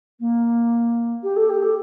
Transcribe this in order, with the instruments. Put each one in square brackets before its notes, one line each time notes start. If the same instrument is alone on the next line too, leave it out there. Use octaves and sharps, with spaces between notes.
[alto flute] A#3
G4
A4
G4
A4